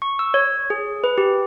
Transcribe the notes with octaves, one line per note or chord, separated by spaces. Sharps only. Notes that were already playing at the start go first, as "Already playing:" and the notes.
C#6
E6
C#5
G#4
B4
G4